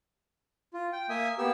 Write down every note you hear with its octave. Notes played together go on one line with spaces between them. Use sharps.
F4
G5
A#3 E5 G#5 D#6
A#3 B3 G4 E6